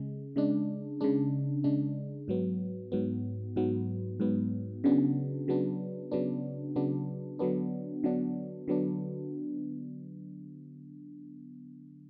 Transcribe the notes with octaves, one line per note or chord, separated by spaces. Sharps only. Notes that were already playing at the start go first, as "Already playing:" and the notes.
Already playing: C#3 G#3
C#3 G#3 D4
C#3 G#3 D4
C#3 G#3 D4
G#2 F#3 B3
G#2 F#3 B3
G#2 F#3 B3
G#2 F#3 B3
C#3 F#3 B3 D4
C#3 F#3 B3 D4
C#3 F#3 B3 D4
C#3 F#3 B3 D4
D3 F#3 B3 D4
D3 F#3 B3 D4
D3 F#3 B3 D4